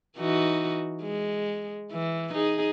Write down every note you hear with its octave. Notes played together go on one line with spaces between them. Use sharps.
E3 D#4 F#4
G#3
E3
D#4 G#4